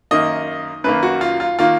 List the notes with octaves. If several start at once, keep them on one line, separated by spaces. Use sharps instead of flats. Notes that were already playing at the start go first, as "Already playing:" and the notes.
F#2 D#3 A#3 D#5
F#2 D#3 A#3 B4
F#4
F4
F4
D#3 A#3 F4